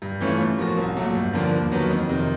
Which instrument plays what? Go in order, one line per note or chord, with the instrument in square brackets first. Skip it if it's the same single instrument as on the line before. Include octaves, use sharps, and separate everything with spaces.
[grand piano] G2
E3 A3 C#4 F4
A2
F3 A#3 C#4 F#4
C2
A#2 F#3 A3
G2
D3 F3 A#3 D4
D#2
D#3 F#3 B3
F2
C3 D#3